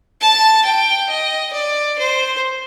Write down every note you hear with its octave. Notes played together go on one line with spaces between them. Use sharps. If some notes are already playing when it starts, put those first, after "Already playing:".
A5
G5
D#5
D5
C5